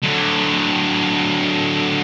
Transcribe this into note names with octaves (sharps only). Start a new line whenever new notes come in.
D3 F#3